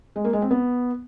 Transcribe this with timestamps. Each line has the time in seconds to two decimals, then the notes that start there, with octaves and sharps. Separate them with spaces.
0.16 G#3
0.24 A#3
0.33 G#3
0.42 C4
0.51 B3